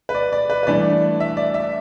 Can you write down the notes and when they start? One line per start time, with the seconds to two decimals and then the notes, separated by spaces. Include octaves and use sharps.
0.09 B4
0.15 D5
0.33 D5
0.50 B4
0.63 B4
0.67 G2 E3 A3 D4 D5
1.20 E5
1.37 D5
1.54 E5